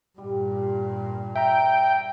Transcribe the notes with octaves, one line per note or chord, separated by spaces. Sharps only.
G2 A#2 G3
E5 G5 A#5